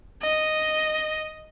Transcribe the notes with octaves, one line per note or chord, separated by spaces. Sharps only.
D#5